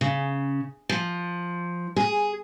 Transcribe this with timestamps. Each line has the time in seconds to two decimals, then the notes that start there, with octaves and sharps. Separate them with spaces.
0.01 C#3
0.89 F3
1.96 G#4